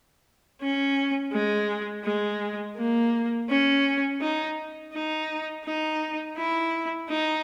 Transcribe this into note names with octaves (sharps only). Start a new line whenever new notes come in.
C#4
G#3
G#3
A#3
C#4
D#4
D#4
D#4
E4
D#4